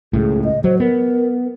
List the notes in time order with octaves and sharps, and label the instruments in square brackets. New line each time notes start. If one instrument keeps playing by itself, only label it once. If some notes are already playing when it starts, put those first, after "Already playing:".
[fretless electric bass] C#2 A2 [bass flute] G#4
[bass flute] D#5
[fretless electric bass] F#3 [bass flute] C5
[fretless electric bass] B3 [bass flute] A#4